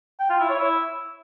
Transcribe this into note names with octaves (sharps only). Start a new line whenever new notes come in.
G5
F4
E4
C#5
E4